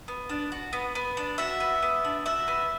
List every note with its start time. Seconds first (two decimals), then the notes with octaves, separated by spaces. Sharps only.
0.08 B3
0.29 D4
0.52 F#4
0.73 B3
0.95 B3
1.17 D4
1.38 F#4 E5
1.60 B3
1.82 B3
2.05 D4
2.26 F#4 E5
2.48 B3